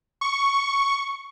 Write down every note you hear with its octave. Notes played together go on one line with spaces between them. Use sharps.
C#6